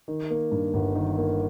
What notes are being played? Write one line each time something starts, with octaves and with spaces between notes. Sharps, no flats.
D#3
A#3
G2
G1
D#3
A#3